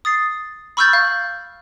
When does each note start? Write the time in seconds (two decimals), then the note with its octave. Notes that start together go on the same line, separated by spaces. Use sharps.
0.05 D#6 A6 C7
0.77 B5 C#6 E6 F6 G6 A6
0.93 F5 G6